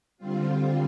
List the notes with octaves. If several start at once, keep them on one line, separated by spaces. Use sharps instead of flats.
D3 G3 C4 F4